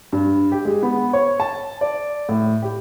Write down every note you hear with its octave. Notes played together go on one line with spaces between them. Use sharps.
G2
G4
G#3
B3
C#5
A5
D5
A2
G4